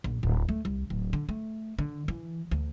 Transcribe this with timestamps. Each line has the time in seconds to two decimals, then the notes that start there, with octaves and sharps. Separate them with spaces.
0.04 A#1
0.23 D1
0.49 A3
0.65 C2
0.90 D1
1.13 D3
1.29 A3
1.79 D3
2.08 E3
2.51 D2